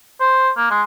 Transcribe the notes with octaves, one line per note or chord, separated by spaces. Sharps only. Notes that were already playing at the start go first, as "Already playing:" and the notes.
C5
A#3
G#3